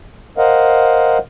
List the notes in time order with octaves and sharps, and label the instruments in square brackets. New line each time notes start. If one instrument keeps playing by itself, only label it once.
[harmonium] A#4 C5 D#5 F5 F#5